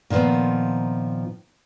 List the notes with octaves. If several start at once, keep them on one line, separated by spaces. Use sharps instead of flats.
A#2 D#3 F3 B3 C4